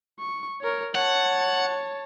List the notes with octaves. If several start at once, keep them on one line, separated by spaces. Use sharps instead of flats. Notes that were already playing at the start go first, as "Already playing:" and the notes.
C#6
A#4 C#5
C#5 F#5 A5